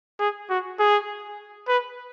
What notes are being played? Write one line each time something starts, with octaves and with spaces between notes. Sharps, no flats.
G#4
F#4
G#4
B4